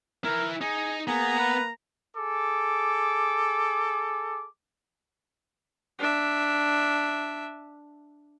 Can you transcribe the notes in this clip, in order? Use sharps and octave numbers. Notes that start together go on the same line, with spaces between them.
E4 A#4 B4
D#4 G#4
A#3 B3 G#4 A#5
B4
G#4 A4 D6
D4 E5